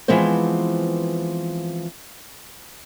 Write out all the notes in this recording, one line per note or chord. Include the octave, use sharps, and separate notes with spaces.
E3 F3 G#3 B3 C4 C5